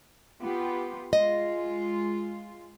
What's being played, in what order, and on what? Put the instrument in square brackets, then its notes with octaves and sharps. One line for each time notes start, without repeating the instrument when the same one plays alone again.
[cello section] B3 F4 G4
[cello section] G#3 F4 [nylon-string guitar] D#5